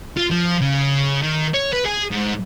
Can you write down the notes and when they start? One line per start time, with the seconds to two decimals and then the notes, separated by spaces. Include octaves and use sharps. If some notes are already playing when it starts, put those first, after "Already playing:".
0.17 F4
0.31 F3
0.62 C#3
1.22 D#3
1.54 C#5
1.73 B4
1.85 G#4
2.11 G#2